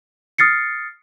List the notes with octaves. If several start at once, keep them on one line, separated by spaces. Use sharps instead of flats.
D#6 F6 A6 C7 C#7